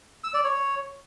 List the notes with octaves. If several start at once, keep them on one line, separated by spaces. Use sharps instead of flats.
E6
D5
C#5